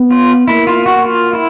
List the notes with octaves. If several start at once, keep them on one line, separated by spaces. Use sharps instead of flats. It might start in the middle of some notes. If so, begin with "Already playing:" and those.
Already playing: B3
F4
A#3 E4
F4
F#4
F4
E4